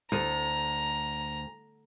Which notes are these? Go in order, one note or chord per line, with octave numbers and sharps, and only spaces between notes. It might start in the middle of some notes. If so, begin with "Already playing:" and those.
D2 A#5